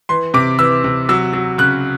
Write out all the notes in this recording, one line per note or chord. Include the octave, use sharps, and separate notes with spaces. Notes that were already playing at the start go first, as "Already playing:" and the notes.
E3 C6
C3 D6
E3 E6
C3
F#3 E6
F#3
C#3 F#6